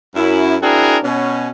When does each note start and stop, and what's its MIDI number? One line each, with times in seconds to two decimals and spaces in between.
0.15 0.56 42
0.15 0.56 64
0.62 0.97 60
0.62 0.97 62
0.62 0.97 64
0.62 0.97 66
0.62 0.97 68
0.62 0.97 70
1.03 1.48 47
1.03 1.48 61